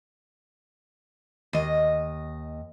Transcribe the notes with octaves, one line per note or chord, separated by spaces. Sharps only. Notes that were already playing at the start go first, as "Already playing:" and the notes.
D#2 D#5